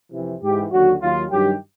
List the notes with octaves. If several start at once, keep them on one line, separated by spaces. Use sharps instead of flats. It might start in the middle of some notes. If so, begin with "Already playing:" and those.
F2 C3 E3
G#2 E3 G4
D#2 D3 F#3 F#4
D#2 D#3 F#3 F4
G2 D#3 F#3 G4